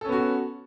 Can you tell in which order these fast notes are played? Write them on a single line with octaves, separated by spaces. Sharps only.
A4 C#4 B3 F#4